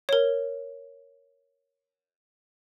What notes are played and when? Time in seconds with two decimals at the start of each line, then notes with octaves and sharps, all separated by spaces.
0.09 A#4 C#5